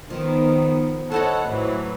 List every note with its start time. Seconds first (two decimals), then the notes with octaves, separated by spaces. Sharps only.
0.10 D#3 F3 B3
1.12 E4 A4 C5 C#5 D#5 F#5
1.52 A2 E3 F#3